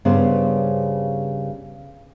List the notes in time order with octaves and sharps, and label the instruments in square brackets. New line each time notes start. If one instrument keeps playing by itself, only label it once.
[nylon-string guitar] G2 C#3 G3 B3 C5